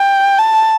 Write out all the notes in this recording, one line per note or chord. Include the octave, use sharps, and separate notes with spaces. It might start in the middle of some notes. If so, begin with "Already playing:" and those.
Already playing: G5
A5